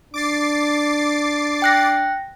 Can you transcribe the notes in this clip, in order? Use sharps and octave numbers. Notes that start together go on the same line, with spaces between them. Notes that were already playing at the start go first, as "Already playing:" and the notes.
D4 D6 A6 C7
G5 F#6 A#6